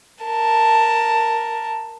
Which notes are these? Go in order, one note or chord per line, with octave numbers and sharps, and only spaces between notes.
A#4 A5